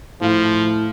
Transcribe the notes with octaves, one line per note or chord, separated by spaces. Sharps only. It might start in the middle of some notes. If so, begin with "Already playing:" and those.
A2 F3 F5